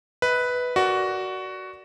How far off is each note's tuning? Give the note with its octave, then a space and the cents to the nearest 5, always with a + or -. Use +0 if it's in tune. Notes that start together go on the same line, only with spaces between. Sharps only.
B4 +0 D#5 +45
F#4 +10 A#4 +0 D5 +0